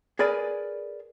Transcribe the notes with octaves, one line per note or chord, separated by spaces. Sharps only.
G#4 A#4 B4 D5 G#5